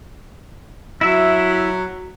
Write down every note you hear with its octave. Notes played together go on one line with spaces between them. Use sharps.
F#3 E4 E5